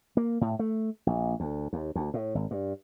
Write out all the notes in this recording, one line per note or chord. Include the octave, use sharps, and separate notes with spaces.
A#3
A2
A3
A#1
D2
D#2
D2
A2
G#1
G2